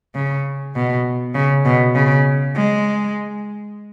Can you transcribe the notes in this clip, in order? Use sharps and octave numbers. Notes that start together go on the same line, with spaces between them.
C#3
B2
C#3
B2
C#3
G#3